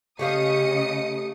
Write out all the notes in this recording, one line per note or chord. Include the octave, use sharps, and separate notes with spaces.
C#3 A3 G4 D#5 F5 D#6 C#7